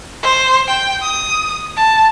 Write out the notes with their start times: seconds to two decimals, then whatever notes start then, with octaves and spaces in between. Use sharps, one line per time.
0.23 C5
0.68 G5
1.02 D#6
1.77 A5